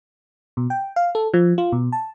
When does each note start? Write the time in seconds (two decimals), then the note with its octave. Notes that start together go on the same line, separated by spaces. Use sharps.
0.57 B2
0.70 G5
0.96 F5
1.15 A4
1.34 F3
1.58 F4
1.72 B2
1.92 A5